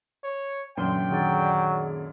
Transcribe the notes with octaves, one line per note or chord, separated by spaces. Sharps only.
C#5
F#2 A#2 D3 E3 G5 C6
D#3 F#3 G#4 D5